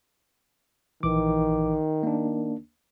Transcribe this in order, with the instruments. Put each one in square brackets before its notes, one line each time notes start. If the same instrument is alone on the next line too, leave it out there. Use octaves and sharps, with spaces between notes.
[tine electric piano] A#1 E3 D6 [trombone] D#3
[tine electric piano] A#3 D4